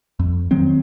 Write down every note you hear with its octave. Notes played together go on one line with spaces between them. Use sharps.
F2
D#3 F#3 C4